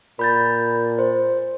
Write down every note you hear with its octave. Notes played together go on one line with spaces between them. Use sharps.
A#2 B5 G6 A6
C5